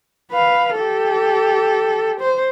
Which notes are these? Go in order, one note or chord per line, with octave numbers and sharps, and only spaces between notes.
B4 F5
G4 A4
C5